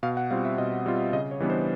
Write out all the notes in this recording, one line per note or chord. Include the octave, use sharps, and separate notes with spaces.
B2 F5
F#5
G3 C4 F4 F5
E5
B2 D#5
G3 C4 F4
C#3 D#5
C#5
E3 G3 B3 D4
C5